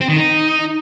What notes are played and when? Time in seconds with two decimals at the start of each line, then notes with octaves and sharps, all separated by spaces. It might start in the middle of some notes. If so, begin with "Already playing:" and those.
0.01 C4
0.09 D#3
0.17 D#4